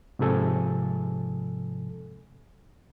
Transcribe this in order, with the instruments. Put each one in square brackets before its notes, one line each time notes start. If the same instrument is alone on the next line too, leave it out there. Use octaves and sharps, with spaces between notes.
[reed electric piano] G#2 C3 F3 A4 G#5